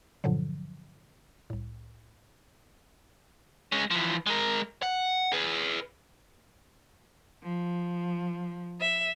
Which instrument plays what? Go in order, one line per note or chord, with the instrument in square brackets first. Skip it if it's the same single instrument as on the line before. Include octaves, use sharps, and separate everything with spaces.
[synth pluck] G2 A#2 D3 F3 F#3
C2 A2
[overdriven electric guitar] G#3 C#4
E3 F3
G#3 A#4
F#5
G#4 B4
[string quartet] F3
E5